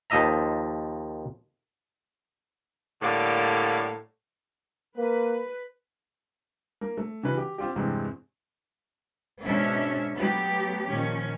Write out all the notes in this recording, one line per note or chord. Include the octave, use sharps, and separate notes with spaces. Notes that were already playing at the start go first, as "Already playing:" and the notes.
D#2 F3 D#5 E5 A#5
A2 D3 G3 A#3
A#3 B4
A#3
A3
C#3 E3 F#4 B4
G4
C4 F4 G4
E2 G2 C3 G#3 C4
G#2 B2 C#4 D4 E5
F#3 A3 B3 G4
A#2 D#3 F3 C#4